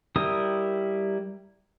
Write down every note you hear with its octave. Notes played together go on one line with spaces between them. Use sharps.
G3 E4 G4 A#4 D#6